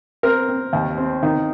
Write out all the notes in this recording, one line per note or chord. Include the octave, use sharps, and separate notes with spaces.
C4 A#4
C4
D#2
C4
D#3